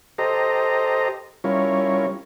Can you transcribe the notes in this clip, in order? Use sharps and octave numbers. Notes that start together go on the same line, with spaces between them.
G4 A4 C5 D#5 A#5
G3 C#4 E4 F4 A#4 C#5